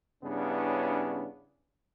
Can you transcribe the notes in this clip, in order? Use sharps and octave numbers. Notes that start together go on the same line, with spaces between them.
G2 C#3 B3 C#4 D4 E4